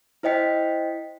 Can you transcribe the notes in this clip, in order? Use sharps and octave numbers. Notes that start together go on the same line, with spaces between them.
E4 C5 D#5 G5 B6